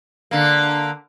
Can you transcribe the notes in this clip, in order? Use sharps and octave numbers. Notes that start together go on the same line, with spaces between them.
D3 A#3